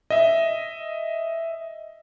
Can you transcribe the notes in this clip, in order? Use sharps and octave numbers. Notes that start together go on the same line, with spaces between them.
D#5 E5